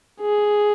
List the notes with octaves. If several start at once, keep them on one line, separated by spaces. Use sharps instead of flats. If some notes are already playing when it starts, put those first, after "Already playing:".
G#4